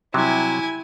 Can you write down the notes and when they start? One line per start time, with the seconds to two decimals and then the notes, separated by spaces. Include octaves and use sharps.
0.14 C3 F#3 G3 E4 G#5